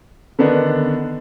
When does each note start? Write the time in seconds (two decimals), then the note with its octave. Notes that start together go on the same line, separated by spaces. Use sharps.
0.39 D3 D#3 B3 D4 D#4